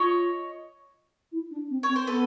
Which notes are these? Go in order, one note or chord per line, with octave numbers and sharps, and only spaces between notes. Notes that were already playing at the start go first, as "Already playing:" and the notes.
Already playing: F4 C#5 D#5
E4
D4
C4
C#5
C4
C5
B3 A4 B4